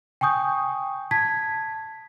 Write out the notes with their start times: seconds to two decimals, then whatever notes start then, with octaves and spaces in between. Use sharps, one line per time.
0.21 G5 G#5 C#6 D#6 G6
1.11 A5 G#6 B6